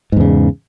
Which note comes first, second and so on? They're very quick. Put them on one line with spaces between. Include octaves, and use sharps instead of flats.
G#2 E2 C#3